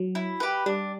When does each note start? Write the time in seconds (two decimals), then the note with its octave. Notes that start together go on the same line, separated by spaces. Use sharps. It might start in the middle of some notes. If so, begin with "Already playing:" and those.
Already playing: F#3
0.15 E4
0.40 G4 B4
0.66 G3 D4